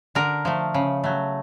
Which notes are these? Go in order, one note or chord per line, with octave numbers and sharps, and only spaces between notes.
D3 A#4
F3 A3
C#3
F#3 A3